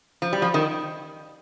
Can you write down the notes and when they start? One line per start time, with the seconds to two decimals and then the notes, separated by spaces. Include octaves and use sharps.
0.22 F3
0.33 G3
0.42 F3
0.54 D#3